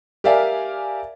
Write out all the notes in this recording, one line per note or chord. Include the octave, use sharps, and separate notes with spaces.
G4 A#4 D5 E5 F5 G#5